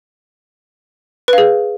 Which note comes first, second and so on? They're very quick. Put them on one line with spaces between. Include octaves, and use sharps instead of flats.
B4 F5 G#4